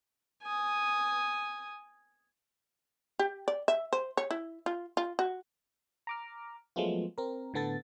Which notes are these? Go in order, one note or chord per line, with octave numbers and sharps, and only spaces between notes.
G#5 D#6
G4
D5
E5
C5
C#5
E4
F4
F4
F#4
A#5 D6 F6
F3 F#3 G#3 A3 B3 F4
C4 A#4
A2 D3 B3 A4 A6